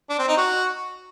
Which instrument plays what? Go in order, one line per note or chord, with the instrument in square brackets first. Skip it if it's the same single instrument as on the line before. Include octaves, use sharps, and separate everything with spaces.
[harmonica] D4
C4
D#4
F#4